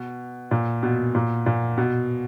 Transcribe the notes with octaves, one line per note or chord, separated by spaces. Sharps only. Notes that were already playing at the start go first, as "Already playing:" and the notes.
Already playing: B2
A#2
B2
A#2
A#2
B2